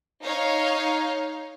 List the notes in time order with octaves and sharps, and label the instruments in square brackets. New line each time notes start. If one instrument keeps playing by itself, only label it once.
[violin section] D#4 C#5 F5